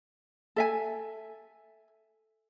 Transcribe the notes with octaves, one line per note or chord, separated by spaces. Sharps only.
A4 E5 G#5